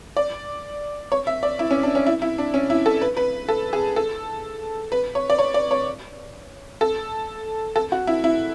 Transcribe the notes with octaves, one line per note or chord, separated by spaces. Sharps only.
D5
C#5
E5
D5
E4
C#4
D4
C#4
E4
E4
D4
C#4
E4
A4
B4
B4
A4
G#4
A4
B4
C#5
D5
C#5
D5
C#5
A4
A4
F#4
E4
E4